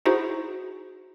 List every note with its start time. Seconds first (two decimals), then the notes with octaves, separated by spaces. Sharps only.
0.06 D#4 E4 F#4 G#4 C5